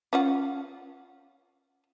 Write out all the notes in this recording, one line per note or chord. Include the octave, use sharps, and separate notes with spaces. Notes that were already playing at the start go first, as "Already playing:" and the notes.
C#4 F4 F#5